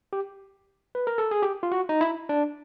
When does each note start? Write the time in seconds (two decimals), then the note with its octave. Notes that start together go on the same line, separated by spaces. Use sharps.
0.13 G4
0.95 B4
1.07 A#4
1.18 A4
1.31 G#4
1.42 G4
1.63 F4
1.72 F#4
1.89 D#4
2.01 E4
2.29 D4